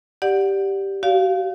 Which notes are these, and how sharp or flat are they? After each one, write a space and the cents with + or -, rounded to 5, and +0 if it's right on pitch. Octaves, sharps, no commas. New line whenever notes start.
G4 +0 D5 +0 F#5 +0
F#4 +40 D5 -35 F5 +0